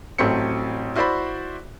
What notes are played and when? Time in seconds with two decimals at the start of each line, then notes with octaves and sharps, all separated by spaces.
0.18 A1 F#3 A3 C4 C#7
0.96 E4 F#4 C5 D5 E5 B5